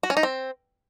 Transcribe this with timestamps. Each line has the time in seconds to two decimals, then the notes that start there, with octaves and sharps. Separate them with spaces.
0.03 F#4
0.10 C#4
0.17 D#4
0.23 C4